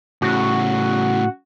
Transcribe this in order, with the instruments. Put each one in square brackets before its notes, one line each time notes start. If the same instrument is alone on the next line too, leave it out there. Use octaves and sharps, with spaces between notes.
[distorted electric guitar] A2 C#3 [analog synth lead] F#4